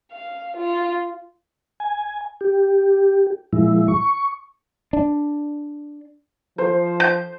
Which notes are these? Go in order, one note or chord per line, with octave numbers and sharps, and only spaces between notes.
F5
F4
G#5
G4
A#2 F3 G#3 E4
C#6
D4
F3 C5
G6